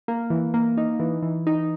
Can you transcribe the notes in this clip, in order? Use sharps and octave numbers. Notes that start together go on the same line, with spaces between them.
A#3
E3
A#3
D#4
E3
E3
D#4